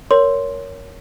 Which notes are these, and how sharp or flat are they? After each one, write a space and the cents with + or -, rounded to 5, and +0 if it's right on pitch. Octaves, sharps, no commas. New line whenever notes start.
A#4 +0 C#5 +15 C6 +0